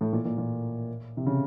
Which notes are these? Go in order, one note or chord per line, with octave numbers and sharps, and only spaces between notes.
A2
A#2
A#2
A#2
C3
C#3